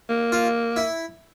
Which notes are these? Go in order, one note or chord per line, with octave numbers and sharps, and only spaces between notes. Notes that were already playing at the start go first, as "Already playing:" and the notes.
A#3
F4
E4